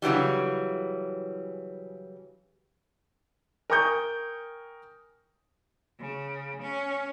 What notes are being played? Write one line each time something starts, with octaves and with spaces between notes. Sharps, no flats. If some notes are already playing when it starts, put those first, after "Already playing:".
C#3 E3 F#3 G3
A#4 G5 G#5 C#6 D#6 G6
C#3
C#4